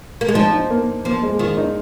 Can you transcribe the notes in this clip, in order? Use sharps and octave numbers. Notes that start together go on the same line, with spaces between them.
A#3
G#3
F3 D#4
D#4
A#3
F3 A#3
G#3
D#3 F4
D#4